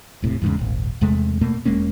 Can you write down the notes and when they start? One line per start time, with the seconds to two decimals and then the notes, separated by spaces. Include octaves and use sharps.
0.22 E1 A2 C3
0.42 E2 G#2 C#3
0.59 D#1 G#1
1.01 E2 C3 G#3 A3
1.41 B2 A3 A#3
1.65 E1 G#3 A#3 C#4